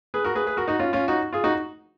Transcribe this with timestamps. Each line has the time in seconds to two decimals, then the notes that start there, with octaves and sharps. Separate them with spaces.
0.14 G#4 B4
0.24 F#4 A#4
0.35 G#4 B4
0.47 G#4 B4
0.57 F#4 A#4
0.68 D#4 F#4
0.79 C#4 F4
0.93 C#4 F4
1.08 D#4 F#4
1.33 F4 G#4
1.44 D#4 F#4